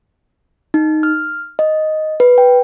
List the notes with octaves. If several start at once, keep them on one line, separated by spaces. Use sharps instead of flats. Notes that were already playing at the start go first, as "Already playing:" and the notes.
D#4
F6
D#5
B4
G5